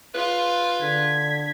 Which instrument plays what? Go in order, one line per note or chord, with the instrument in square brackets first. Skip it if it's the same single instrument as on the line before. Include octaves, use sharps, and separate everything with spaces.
[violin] F4 [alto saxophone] B4
[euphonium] D3 [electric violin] G#6 B6